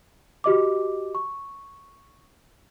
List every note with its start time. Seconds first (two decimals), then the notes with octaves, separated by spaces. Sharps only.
0.44 F#4 G4 D#5 D6
1.15 C#6